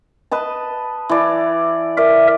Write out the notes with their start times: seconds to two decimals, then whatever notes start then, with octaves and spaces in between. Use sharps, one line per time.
0.31 B4 D#5 A5
1.09 E3 D5
1.97 A#4 D5 E5